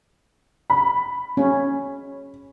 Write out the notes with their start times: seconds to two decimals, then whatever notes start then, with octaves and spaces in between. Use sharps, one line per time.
0.70 B5
1.37 C#4